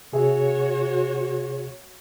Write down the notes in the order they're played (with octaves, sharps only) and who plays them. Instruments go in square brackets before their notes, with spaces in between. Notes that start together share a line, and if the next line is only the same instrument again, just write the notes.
[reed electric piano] C3 G#4 E5 [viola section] F#4 C#5